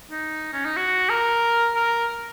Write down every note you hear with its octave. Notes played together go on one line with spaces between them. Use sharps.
D#4
C#4
D#4
F#4
A#4
A#4